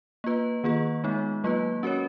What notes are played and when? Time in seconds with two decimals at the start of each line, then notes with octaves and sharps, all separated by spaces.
0.24 A#3 F4 B4
0.64 D#3 A#3 F4 G#4
1.04 G#3 B3 D#4
1.44 F#3 A#3 F4 B4
1.83 C#4 F#4 A#4 C#5